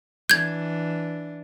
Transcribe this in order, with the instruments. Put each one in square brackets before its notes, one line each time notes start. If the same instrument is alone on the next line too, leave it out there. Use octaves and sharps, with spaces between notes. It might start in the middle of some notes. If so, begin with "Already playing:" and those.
[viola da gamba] E3 D4 [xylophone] G6 G#6